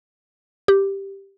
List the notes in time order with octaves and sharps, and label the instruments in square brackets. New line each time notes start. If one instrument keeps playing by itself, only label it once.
[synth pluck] G4